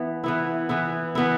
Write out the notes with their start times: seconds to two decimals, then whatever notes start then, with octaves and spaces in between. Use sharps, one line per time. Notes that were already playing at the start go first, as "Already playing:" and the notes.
Already playing: E3 B3
0.24 E3 B3 E4
0.69 E3 B3 E4
1.15 E3 B3 E4